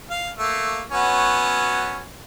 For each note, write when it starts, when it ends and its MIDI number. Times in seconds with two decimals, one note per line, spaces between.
0.11 0.29 77
0.38 0.81 57
0.38 0.81 58
0.91 2.05 54
0.91 2.05 59
0.91 2.05 61